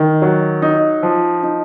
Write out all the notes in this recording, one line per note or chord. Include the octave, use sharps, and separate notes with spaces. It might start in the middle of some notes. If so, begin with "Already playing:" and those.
Already playing: D#3
F#3
D#4
F3
D#4